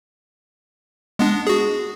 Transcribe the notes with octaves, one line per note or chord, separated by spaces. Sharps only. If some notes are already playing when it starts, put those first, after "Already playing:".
G#3 B3 D4
F#4 G#4